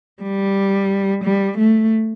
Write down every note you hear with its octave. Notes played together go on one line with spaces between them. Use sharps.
G3
G3
A3